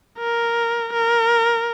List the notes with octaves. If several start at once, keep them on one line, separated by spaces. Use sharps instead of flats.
A#4
A#4